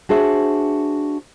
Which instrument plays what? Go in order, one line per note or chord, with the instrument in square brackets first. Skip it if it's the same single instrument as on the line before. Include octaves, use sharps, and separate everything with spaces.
[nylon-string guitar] D4 F#4 G#4 C5 E5